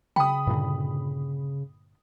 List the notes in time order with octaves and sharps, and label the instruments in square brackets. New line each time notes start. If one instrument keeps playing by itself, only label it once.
[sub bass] C#3 [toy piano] G5 [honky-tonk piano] B5 D#6
[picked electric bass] G2 A#2 D3